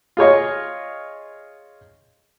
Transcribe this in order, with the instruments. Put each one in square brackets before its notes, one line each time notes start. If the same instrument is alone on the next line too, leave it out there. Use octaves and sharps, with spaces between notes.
[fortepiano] F4 G#4 C#5 D#5